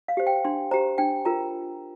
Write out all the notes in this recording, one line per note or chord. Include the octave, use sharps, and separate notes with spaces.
F5
G4 C5
G5
D4 C6
G4 C5 A#5
D4 G5
F4 A#4 A#5